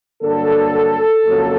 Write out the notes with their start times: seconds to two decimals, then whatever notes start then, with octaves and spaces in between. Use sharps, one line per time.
0.22 G2 D3 F#3 A#3 A4
1.26 F2 C#3 F#3 A#3